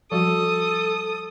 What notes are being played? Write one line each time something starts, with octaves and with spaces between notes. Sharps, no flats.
F3 G3 F#4 A4 D#6